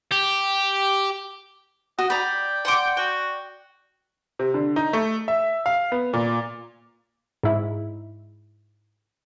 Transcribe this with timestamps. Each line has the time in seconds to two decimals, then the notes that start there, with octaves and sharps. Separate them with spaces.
0.11 G4
1.99 F#4 D#5
2.10 D5 G5 A#5 B5
2.65 F#5 C6 D6
2.97 F#4 G5
4.39 C3
4.54 D3
4.76 D#4
4.93 A3
5.28 E5
5.66 F5
5.92 B3
6.13 A#2
7.43 G#2 E4